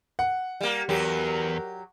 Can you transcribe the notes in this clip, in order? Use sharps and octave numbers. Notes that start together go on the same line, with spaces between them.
F#5
G3 A#3
E2 F#3 G4 A#4